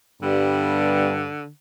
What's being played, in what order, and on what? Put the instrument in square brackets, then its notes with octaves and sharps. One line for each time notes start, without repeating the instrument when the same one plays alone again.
[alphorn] G2 [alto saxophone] D3 [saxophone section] G3 B3